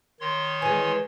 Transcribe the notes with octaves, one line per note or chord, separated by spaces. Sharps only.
D#3 C#5 C6
E3 G#3 G#5